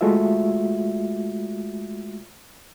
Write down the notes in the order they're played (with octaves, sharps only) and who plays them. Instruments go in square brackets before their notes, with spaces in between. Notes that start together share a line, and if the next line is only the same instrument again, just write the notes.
[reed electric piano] G#3 A3 F4 F#4 E5